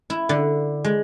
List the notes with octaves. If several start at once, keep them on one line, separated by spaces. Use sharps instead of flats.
E4
D3
G#3